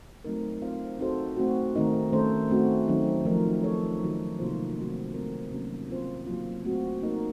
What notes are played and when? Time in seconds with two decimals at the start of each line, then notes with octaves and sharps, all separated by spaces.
0.25 F#3 A3 C4 D#4 A#4
0.62 C4 F4 C5 F5
0.99 C4 D#4 F#4 A4 C5
1.37 A3 C4 F#4
1.75 D#3 A3 C4 D#4 A#4
2.12 D#3 A3 C#4 A4 C5
2.50 A3 C4 F#4
2.88 D#3 F#3 C4 D#4
3.25 F3 A3 D#4 A#4
3.63 A3 D#4 A4 C#5
4.01 D#3 F#3 C4
4.39 C3 F#3 A#3 F4 C5
4.76 F#3 A3 C4 D#4 F#4
5.14 A3 C4 D#4 A#4
5.52 C3 F#3 A#3 C#4
5.89 C4 F4 C5
6.27 C#3 F#3 A#3 F4
6.65 A3 C4 F#4
7.02 A#3 D#4 A#4